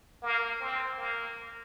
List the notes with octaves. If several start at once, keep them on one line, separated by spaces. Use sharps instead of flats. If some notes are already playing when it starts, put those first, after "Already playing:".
A#3
C4
A#3